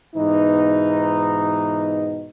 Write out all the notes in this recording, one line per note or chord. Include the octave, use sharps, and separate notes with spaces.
G#2 B2 E3 B3 D#4